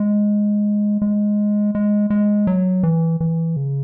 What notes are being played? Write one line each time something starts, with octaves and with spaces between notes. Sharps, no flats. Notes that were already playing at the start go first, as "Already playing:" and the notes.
Already playing: G#3
G#3
G#3
G#3
F#3
E3
E3
C#3